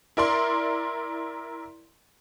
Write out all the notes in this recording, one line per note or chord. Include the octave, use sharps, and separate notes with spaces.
E4 A#4 D5 C6